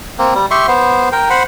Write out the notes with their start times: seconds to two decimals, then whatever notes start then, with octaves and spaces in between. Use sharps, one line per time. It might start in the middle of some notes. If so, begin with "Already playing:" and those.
0.18 A#3 C4
0.35 G3
0.51 G4 E5 C6 C#6
0.68 B3 C5
1.12 A#4 G5
1.30 C5 F#5 B5